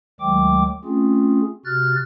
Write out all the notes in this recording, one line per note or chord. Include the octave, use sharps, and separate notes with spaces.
D2 D#3 F#3 G#3 G5 D6
A3 C4 C#4 F4 G#4
C3 F#4 F6 F#6 A6